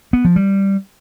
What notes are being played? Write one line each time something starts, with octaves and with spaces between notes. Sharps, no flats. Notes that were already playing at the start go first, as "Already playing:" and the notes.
B3
F3
G3